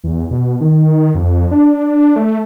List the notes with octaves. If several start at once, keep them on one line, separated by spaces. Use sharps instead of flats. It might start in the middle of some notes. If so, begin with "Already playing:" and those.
E2
B2
D#3
F2
D4
A3